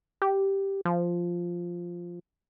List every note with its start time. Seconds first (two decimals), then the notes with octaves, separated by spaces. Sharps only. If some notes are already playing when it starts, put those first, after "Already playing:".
0.22 G4
0.85 F3